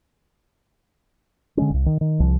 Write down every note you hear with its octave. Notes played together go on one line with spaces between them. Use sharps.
D3 G#3 C#4
D1 C2
D#3
D#3
C2 F3